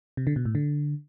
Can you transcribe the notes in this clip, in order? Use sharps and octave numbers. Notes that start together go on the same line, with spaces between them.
C3
D3
B2
A2
D3